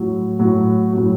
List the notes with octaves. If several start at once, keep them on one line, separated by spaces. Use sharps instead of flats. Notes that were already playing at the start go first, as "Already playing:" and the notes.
Already playing: A2 F#3
A2 F#3
A2 F#3